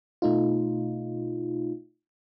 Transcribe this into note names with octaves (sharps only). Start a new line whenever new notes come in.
B2 A3 D#4 F4